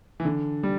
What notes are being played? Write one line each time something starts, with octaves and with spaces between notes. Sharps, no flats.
E3
D3
G3